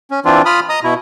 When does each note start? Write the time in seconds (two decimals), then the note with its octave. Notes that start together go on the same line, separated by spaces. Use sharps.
0.11 C#4
0.25 E3 C4 D4 F4
0.45 F4 B5 D#6 F6
0.69 D#5 A#5 D#6
0.83 B2 E4